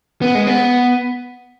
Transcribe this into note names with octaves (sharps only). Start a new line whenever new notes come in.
B3
G#3
B3